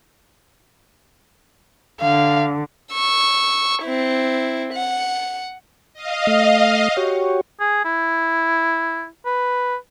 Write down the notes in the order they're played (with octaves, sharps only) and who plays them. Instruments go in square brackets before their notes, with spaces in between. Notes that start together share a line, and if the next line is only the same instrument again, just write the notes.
[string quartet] D3 [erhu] F5
[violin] C#6 E6
C4 E4
F#5
[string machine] D#5 F5
[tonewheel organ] A3
F#4 G4 C#5
[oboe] G#4
E4
B4